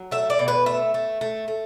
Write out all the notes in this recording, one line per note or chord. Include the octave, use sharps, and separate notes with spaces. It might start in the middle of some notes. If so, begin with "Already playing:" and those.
Already playing: F#3
A3 E5
D5
B2
B4
A3 E5
A3
A3
A3